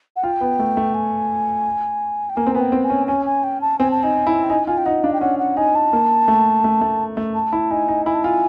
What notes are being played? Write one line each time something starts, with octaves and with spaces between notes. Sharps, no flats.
F#5
F4 G5
B3
A3
A3
G#5
G5
A#3 G#5
C4
B3 G#5
G5
C4
G#5
C#4
C#4 G#5
G#5
G5
A5
C4 G#5
A5
D#4 G#5
E4
G5
D#4 G#5
F4 G#5
G5
D#4 F#5
D4 F5
G5
C#4 F#5
F#5
D#4 G#5
A5
A#3
A3
A3
A3
A3
A5
E4
D#4 G#5
D#4
E4 G#5
A5
F4 G#5